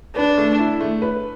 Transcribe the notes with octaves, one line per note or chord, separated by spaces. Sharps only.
D4 B4
A3
E4
A3
B4